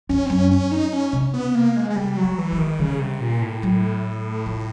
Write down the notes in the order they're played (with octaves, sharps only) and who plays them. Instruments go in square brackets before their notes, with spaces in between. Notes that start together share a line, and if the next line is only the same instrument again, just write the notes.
[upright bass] F2 [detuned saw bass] C#4
[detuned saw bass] C4
[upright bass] F#2 [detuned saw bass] C#4
[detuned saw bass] C#4
D#4
C#4
[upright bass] C3
[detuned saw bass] B3
A#3
G#3
G#3
[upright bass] C#3 [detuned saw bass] G3
[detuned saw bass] F#3
[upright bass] G3
[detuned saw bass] E3
[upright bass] G#3
[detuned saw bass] D#3
[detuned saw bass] C#3 [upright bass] G3
[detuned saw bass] C3
A#2
A2
[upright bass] F#3
F3